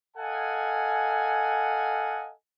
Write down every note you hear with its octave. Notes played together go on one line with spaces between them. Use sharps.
A4 D#5 F5 F#5 G#5